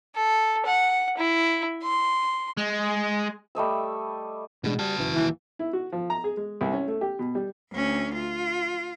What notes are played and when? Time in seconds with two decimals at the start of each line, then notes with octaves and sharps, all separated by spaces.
0.15 A4
0.66 F#5
1.17 E4
1.83 C6
2.57 G#3
3.55 G3 A3 D#5 E6
4.64 A1 B2 G#3 D4
4.79 G3 F#4 A5
4.98 B1 F#2 E3
5.15 D#1 D#2 E3
5.59 E4
5.73 F#4
5.92 F3
6.10 A#5
6.24 G#4
6.37 G#3
6.61 C2
6.73 C#4
6.88 A3
7.01 G4
7.19 B2
7.35 G3
7.72 D2 C#4
8.15 F4